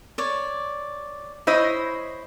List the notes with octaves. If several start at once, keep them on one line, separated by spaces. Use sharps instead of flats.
C#5 D5
E4 C5 C#5 D#5 E5